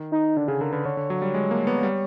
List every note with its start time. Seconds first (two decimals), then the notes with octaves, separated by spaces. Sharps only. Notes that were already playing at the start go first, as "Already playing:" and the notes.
Already playing: D#3
0.12 D#4
0.37 D3 D4
0.48 C#3 G#4
0.61 D3 A#4
0.73 D3 B4
0.85 D3 C#5
0.97 D3
1.10 F#3
1.22 G3
1.34 G#3
1.51 A#3
1.67 B3
1.83 G3